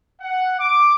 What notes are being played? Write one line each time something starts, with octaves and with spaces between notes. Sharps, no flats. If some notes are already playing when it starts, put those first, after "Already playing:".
F#5
D6